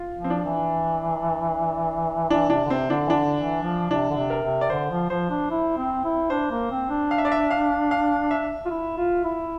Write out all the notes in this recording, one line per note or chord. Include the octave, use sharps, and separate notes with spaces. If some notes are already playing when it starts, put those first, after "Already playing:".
Already playing: F4
F3
C4
D4
E3
E3 D4
C3 D4
D3
C3 C4
D3 D4
E3
D3 D4
E3
F3
C3 D4
D3
C3
A#4
C3
D5
D3 C5
F3
F3 C5
D4
E4
C4
E4
D4 C5
A#3
C4
D4
F5
E5
D5
E5
F5
F5
E5
F4
E4
F4
E4